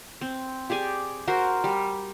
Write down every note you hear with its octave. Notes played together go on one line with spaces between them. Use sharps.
C4
G4 G#4 D5 G#5
F#4 A#4 C5
G3